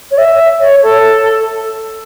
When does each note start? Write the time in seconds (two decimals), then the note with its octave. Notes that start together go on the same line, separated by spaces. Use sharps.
0.11 C#5
0.18 E5
0.61 C#5
0.83 A4